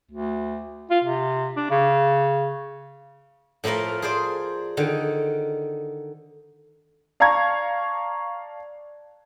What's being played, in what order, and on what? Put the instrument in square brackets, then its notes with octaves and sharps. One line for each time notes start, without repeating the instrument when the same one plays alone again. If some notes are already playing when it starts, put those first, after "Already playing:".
[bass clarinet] D2
F4
C3
D4
C#3
[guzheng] A2 F3 A3 A#4 F5
G#4 C5 D5
D3 D#3
[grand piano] D5 F5 A5 A#5 C#6 G#6